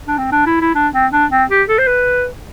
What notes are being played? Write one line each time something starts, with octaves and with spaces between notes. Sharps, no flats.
D4
C4
D4
E4
E4
D4
C4
D4
C4
G4
A4
C5
B4